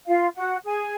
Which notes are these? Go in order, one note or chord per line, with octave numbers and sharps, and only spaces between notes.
F4 F5
F#4 F#5
G#4 G#5